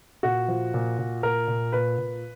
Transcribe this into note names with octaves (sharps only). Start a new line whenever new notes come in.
A#2 F#4
F3
A#2
A#2
A#2 A#4
A#2
A#2 B4
A#2